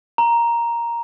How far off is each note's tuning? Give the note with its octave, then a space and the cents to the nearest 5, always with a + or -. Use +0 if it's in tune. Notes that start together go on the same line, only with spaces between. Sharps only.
A#5 +5